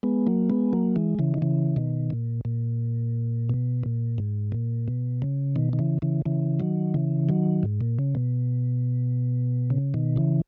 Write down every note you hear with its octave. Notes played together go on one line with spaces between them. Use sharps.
G#3 B3
F#3 A#3
G#3 B3
F#3 A#3
E3 G#3
C#3 E3
D#3
C#3 E3
B2 D#3
A#2
A#2
B2
A#2
G#2
A#2
B2
C#3
B2 D#3
D#3
C#3 E3
C#3 E3
C#3 E3
D#3 F#3
C#3 E3
D#3 F#3
G#2
A#2
C#3
B2
C#3
B2 D#3
C#3 E3